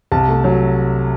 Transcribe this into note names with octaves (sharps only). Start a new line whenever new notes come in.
C2 A5
A3
F#3